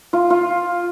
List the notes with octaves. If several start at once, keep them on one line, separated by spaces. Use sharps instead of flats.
F4
F4